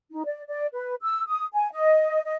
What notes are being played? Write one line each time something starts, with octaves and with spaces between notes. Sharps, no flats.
D#4
D5
D5
B4
E6
D#6
G#5
D#5
D#5